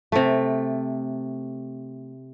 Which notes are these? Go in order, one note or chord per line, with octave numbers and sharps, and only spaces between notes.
C3 A3